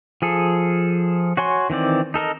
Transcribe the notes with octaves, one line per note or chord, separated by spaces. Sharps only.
F3 G#4 A4
F#4 C#5 G#5 C6
D#3 E3 C4 D5
D#4 A4 A#4 D#5